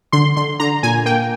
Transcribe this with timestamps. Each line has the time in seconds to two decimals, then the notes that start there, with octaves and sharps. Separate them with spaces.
0.12 D3 C6
0.36 D3 C6
0.60 D3 A#5
0.83 A#2 G#5
1.06 A#3 G5